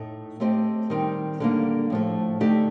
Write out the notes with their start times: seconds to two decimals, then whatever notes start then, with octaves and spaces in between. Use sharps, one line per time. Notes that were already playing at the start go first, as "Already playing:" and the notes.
Already playing: A2 A3 D#4
0.40 A3 C4 G4 C5 D#5
0.90 D#3 G3 C4 D#4
1.40 D3 G3 A#3
1.90 A2 F3 A3
2.40 D3 A3 D#4 G4 D5